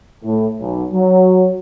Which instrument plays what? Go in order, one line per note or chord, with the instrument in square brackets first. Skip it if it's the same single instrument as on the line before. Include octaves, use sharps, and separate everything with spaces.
[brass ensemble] A2
B1
F#3